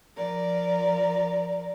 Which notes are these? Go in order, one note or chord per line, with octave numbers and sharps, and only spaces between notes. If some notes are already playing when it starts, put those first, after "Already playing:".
F3 A#4 D5